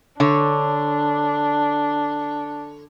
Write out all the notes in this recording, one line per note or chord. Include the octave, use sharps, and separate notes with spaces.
D3 D4 C#5